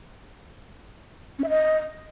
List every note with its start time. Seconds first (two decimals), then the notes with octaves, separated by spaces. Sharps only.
1.39 C#4
1.44 E5
1.49 D#5